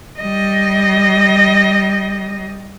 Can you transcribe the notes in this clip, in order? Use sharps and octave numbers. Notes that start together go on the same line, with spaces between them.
G3 D#5